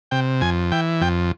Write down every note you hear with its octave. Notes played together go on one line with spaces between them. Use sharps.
C3 G5
F2 G#5
E3 G5
F2 G5